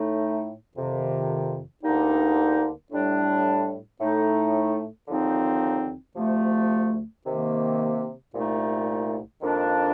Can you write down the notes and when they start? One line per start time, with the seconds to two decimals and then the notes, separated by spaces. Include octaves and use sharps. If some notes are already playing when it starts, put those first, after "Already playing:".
Already playing: A2 A3 D#4
0.74 F2 C3 D#3
1.82 D2 D3 G3 A#3 D#4
2.91 A2 G3 D4
3.98 A2 A3 D#4
5.07 D#2 D3 F3 C4 D#4
6.15 D2 C3 F3 A3
7.24 C3 D#3 A#3
8.32 C2 A#2 A3 D#4
9.40 F2 D#3 A#3 D4